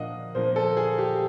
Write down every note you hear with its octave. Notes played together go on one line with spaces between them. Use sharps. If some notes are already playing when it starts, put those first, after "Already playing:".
Already playing: A#2 F3 A#3 D4 D#5 F5 F#5
A#2 F3 A#3 D4 C5
A4
G#4
G4